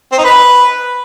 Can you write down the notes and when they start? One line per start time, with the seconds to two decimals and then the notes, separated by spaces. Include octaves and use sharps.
0.12 C4
0.18 D#4
0.24 B4